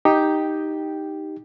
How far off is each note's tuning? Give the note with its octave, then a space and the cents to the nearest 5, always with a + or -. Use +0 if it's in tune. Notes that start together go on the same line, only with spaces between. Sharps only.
D#4 +0 G4 +0 G5 +0